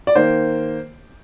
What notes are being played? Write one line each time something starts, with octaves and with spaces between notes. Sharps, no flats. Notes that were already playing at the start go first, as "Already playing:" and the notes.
D5
D#3 A#3 C5